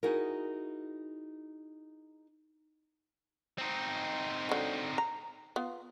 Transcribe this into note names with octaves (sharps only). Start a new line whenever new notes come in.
D#4 E4 F#4 G#4 A#4
C4 D#4
D3 F#3
A#5
B3 F4